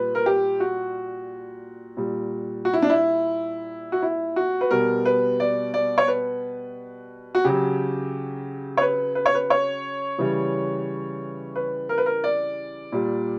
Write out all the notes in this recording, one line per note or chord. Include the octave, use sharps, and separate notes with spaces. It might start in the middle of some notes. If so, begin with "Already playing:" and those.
Already playing: A#2 G3 B4
A#4
G4
F#4
A#2 G3
F#4
E4
D4
E4
F#4
E4
F#4
B4
B2 G3 A#4
B4
D5
D5
C#5
B4
F#4
C#3 F#3 G4
C#5
B4
B4
C#5
B4
C#5
C#3 E3 G3
B4
A#4
B4
A#4
D5
A#2 G3